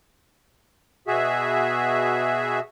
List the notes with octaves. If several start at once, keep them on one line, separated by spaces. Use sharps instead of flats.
B2 F#4 G#4 E5